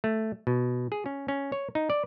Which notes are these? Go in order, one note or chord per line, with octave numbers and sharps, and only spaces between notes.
A3
B2
G#4
C#4
C#4
C#5
D#4
D5